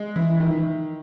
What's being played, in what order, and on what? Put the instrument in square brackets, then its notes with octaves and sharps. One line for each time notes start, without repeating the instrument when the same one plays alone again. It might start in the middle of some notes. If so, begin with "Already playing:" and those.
Already playing: [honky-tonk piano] G#3
[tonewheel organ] E3 [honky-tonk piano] E4
[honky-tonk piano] D#3